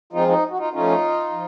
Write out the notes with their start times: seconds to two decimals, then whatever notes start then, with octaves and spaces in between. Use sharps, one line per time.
0.13 F3 G#3 C4 D#4 F4
0.28 D#4
0.51 F#4
0.58 D#4 F4
0.73 F3 A3 C#4 D#4 F4
1.32 F3